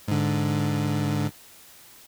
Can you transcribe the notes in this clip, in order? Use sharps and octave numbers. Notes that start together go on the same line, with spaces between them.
G#2 D3